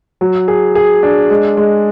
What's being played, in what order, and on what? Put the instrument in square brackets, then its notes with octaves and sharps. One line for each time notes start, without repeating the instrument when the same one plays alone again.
[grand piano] F#3
G#4
G#4
D4
G#3
G#3